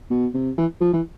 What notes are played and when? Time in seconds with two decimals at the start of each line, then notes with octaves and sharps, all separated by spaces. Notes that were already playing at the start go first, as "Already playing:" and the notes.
0.10 B2
0.34 C3
0.58 E3
0.81 F3
0.93 E3